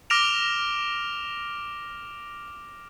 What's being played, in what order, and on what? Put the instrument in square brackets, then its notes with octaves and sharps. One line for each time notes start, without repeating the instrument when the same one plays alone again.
[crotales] D6 F6 A#6 D7 E7 F7